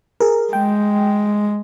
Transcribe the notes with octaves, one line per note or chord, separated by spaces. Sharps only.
G#4 A#4
G#3 G5